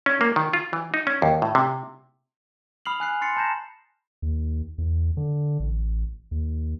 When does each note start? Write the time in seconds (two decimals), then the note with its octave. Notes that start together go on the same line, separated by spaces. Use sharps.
0.06 C#4
0.21 A#3
0.36 D#3
0.53 F4
0.73 E3
0.94 D#4
1.07 C#4
1.22 D#2
1.42 A2
1.55 C3
2.86 B5 D#6 F6 C7 F7 F#7
3.00 G#5 F#6 C7
3.21 C6 A6 C7 C#7
3.37 A5 A#5 G6 A#6 E7
4.22 D#2
4.78 E2
5.17 D3
5.60 A1
6.31 D#2